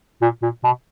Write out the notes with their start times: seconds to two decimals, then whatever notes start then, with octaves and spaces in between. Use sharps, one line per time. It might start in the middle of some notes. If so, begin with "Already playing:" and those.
0.22 A#2
0.42 A#2
0.64 B2